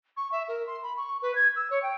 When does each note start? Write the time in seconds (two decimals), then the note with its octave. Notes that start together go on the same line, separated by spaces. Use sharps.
0.17 C#6
0.32 E5
0.48 A#4
0.67 C6
0.83 B5
0.97 C#6
1.22 B4
1.35 G#6
1.56 E6
1.70 C#5
1.82 G5